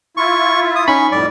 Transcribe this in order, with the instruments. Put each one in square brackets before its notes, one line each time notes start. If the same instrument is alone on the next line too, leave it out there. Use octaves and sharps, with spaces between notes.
[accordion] E4 F4 [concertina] C#6
[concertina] D#6
[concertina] C#4 C#6 [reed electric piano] D#4 B5
[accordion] F2 A2 G3 [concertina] D5